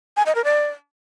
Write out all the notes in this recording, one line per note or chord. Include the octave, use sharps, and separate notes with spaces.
G#5
D#5
A#4
D5